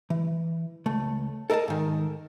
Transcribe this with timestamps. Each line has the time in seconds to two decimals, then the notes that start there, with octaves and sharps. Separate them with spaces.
0.10 E3
0.86 C#2 A3
1.50 A4 A#4 D#5 F5 A5
1.68 G#2 D#3